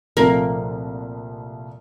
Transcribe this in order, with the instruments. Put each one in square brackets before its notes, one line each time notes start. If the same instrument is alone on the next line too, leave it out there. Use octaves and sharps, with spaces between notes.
[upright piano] C2 A#2 F3 A3 C4 [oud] A#3